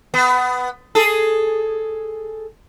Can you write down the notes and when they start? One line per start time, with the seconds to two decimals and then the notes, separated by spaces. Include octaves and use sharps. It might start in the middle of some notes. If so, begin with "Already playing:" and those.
0.14 B3
0.95 G#4 A4